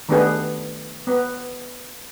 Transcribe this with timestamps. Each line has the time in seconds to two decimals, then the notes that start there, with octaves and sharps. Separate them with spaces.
0.09 D#3 A3 B3 D4 G4 G#4
1.07 B3